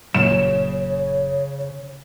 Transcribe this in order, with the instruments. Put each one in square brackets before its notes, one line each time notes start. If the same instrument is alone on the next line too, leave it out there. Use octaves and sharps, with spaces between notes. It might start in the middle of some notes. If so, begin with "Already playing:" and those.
[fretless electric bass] F#1 A#2 F#3 [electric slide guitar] C#3 [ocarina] C#5 [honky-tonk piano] E7